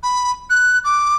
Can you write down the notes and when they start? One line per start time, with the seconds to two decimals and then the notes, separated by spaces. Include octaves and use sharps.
0.03 B5
0.49 F#6
0.84 D6